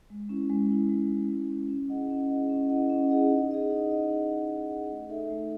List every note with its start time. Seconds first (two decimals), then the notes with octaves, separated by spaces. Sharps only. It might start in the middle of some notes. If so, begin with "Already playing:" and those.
0.10 G#3
0.29 C#4 E4
0.49 G#3
0.70 C#4 E4
0.90 G#3
1.09 C#4 E4
1.29 G#3
1.50 C#4 E4
1.69 C#4
1.89 E4 G#4 D#5 F#5
2.10 C#4
2.29 E4 G#4 D#5 F#5
2.49 C#4
2.69 E4 G#4 D#5 F#5
2.89 C#4
3.10 E4 G#4 D#5 F#5
3.30 D#4
3.50 G#4 D#5 F#5
3.70 D#4
3.89 G#4 D#5 F#5
4.10 D#4
4.29 G#4 D#5 F#5
4.50 D#4
4.69 G#4 D#5 F#5
4.90 A3
5.09 D#4 A4 E5
5.30 A3